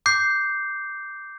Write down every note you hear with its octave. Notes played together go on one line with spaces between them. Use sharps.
D6 G6 C7